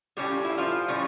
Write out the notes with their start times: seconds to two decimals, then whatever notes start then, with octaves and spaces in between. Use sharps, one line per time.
0.17 A2 G3 C#4 G4
0.31 F4
0.45 E4
0.58 F3 F4
0.88 A2 G3 C#4